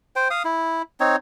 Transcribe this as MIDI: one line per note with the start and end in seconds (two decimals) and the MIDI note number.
0.16 0.28 72
0.16 0.28 79
0.30 0.43 77
0.30 0.43 87
0.45 0.82 64
1.00 1.16 60
1.00 1.16 63
1.00 1.16 73